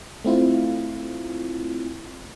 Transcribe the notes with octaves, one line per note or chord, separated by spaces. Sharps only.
A3 C4 E4 F4